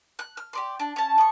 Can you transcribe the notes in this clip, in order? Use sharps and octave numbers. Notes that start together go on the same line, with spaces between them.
F#6
F6
G4 D5 C6
D4
C#4 A5
B3 C#6